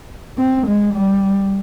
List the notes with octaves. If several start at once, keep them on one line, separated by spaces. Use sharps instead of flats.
C4
G#3
G3